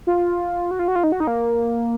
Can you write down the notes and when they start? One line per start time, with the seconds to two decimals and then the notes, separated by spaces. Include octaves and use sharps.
0.07 F4
0.71 F#4
0.79 F4
0.88 F#4
0.96 F4
1.04 D#4
1.12 F#4
1.20 D#4
1.27 A#3